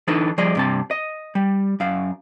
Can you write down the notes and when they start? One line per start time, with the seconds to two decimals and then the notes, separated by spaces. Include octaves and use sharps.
0.08 E3 D4 D#4 A4 B4
0.38 F3 G3 G#4 D5 D#5
0.55 G2 C3 A5
0.91 D#5
1.35 G3
1.80 F#2 F5